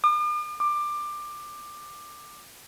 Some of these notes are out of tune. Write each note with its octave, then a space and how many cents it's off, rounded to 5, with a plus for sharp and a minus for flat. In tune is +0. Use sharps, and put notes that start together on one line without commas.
D6 +45
D6 +20